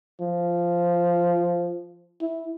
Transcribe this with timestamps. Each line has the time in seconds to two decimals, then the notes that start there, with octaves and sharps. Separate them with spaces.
0.21 F3
2.22 E4